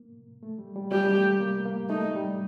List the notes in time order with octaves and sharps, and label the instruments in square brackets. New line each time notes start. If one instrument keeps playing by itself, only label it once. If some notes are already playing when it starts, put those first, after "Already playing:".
Already playing: [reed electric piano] A#3
A3
G3
G3
[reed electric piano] G3 [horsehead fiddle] G4
[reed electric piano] A3
A#3
A#3
[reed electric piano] A3 [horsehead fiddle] D#4
[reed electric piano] G3